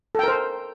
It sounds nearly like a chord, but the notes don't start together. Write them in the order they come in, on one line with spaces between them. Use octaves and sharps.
A4 G5 A#4 C5